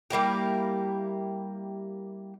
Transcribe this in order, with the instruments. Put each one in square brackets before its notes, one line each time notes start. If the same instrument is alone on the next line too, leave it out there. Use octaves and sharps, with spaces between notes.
[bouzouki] G3 A#3 E4 G4